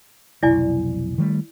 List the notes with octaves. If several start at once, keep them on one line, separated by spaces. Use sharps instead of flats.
F1 B1 E4 D5 G#5
D#3 G3 A3